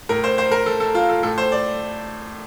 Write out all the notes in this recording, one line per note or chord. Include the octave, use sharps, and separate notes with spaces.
A2 A#4
C5
C5
A#4
A4
A4
F4
A4
A2 A4
C5
D5